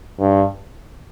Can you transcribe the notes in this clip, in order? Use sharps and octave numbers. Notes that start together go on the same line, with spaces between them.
G2